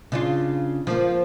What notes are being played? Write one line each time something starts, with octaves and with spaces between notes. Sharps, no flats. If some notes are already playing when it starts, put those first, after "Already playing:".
C#3 D4 F4
F3 A#3